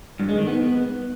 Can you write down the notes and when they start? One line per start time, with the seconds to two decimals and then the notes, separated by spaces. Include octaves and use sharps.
0.20 G2
0.29 G#3
0.38 D#3
0.47 B3